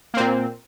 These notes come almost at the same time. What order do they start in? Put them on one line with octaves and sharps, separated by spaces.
A#3 C4 A#2